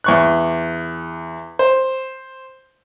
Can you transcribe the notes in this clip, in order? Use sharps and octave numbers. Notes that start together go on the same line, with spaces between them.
E2 C#6 F#6
C5